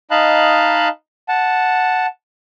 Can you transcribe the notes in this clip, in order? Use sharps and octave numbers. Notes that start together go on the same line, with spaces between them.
D#4 D#5 F5 A5 B5 F#6
F#5 A5